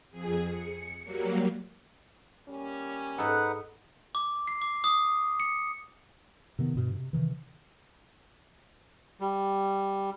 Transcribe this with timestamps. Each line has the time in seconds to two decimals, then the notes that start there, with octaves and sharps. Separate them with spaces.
0.11 F2 G#4
0.50 C#7
1.03 F#3 G3 A#3
2.49 G3 A#3 C#4
3.18 G#2 D#4 A4 B4 F#5
4.15 D6
4.47 C7
4.62 D6
4.84 D#6
5.40 C#7
6.59 C3 D#3 B3
6.75 G2 B2
6.95 C3
7.13 C3 D#3 E3
9.20 G3